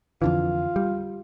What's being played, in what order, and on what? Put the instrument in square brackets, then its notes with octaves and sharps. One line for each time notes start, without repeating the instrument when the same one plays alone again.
[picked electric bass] F2 D3 E3 [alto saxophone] F4
[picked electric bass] G3